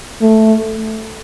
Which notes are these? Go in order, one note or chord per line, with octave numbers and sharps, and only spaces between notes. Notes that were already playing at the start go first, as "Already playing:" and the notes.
A3